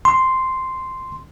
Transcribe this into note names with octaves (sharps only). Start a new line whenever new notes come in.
C6